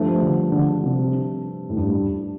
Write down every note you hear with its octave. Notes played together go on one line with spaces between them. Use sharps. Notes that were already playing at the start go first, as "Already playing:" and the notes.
Already playing: G2 F3 A3
D3
D3
C3
A2
G2